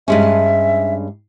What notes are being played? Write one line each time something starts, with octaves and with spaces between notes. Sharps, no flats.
G2 G#3 C#4 E5